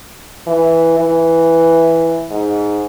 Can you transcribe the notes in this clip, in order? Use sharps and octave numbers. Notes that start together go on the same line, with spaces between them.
E3
E3
G#2